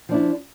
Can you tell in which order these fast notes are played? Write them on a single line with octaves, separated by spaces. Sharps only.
F3 D4 E4